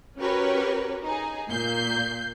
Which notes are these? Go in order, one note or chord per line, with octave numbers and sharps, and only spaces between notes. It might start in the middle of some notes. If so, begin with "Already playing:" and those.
C#4 F#4 G4 A#4 B4 C#5
D#4 G#4
A#2 A#3 G6 C7